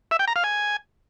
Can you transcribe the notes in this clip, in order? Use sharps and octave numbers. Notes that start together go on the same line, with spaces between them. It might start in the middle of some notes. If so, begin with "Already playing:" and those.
E5
G5
A#5
F5
G#5